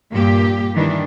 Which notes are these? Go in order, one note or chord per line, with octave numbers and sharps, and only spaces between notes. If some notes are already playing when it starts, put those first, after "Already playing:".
G2 A#2 A#3 G4
D#3 E3 G3 D4